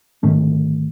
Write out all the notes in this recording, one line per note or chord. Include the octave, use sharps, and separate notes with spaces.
G#2 D3 D#3 A3